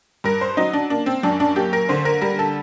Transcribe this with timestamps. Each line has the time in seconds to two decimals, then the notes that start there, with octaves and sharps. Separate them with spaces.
0.24 G2 A#4
0.41 C5
0.57 F#3 D#4
0.73 D4
0.90 A#3 D4
1.06 C4
1.23 F#2 D4
1.40 D4
1.56 A#3 G4
1.73 A#4
1.89 D3 C5
2.05 A#4
2.21 G3 A#4
2.39 A4